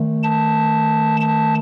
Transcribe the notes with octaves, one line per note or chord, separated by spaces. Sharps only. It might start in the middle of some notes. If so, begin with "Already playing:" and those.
Already playing: D#3 A3
A5
A5